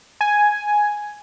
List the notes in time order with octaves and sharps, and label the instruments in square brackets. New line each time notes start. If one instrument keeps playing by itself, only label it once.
[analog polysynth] G#5